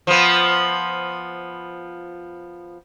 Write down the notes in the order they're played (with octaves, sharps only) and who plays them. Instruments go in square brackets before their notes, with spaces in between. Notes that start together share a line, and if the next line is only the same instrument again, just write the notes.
[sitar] F3 B3